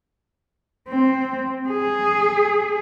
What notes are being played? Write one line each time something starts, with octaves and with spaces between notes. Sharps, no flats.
C4
G#4